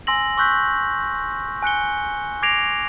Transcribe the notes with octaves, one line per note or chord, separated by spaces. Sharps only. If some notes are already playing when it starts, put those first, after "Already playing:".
G#5 C6 E6 A#6 F#7
C6 C#6 E6 F#6 G6 B6
G#5 F#6 C#7 G7
D6 G#6 A#6 C7 D7 F7